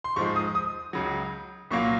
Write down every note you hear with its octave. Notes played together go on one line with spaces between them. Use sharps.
C6
G#2 F3 G#3 C#6
D#6
D#6
C#2 C#3 F#3
C2 A#2 F#3 A#3 C#6